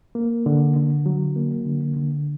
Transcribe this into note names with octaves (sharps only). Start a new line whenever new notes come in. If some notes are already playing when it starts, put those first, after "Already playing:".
A#3
D3
D3
F#3
A#3
D3
D3